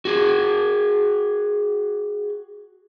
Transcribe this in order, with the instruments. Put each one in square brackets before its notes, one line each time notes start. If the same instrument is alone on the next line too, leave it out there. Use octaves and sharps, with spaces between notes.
[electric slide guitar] F#4 G#4